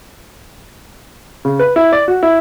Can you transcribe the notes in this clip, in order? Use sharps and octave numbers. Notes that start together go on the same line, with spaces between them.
C#3
B4
E4
D5
F#4
E4